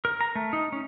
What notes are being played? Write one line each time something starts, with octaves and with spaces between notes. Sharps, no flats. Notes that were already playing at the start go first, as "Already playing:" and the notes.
A#4
A#5
A3
D#4
C#4